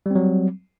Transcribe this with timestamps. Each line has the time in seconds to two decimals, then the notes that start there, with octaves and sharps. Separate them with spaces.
0.06 G3
0.11 C4
0.15 F#3